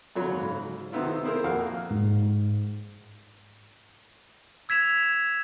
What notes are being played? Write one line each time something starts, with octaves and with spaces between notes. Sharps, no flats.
F#2 F#3 C#5 B5
G#2 C#3
C3 D#3 B3 E4 F4
C4 E4 G#4 A#4 C5
F2 A#2 F#4 A#4 F5
G#2
E6 G#6 B6 E7 F7